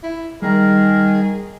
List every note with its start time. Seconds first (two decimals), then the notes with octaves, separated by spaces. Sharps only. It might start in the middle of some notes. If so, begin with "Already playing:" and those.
0.03 E4
0.42 D#3 G3 G#4 A#4